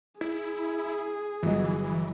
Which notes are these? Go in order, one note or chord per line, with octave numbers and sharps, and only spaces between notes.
E4 G#4
G1 E3 F#3 D#5